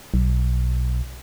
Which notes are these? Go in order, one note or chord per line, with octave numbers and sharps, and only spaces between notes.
B1